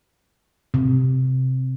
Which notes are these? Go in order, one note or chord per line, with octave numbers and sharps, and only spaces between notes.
C3